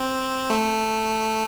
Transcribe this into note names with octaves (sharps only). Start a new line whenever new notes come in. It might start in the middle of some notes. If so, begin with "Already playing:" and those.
Already playing: C4
A3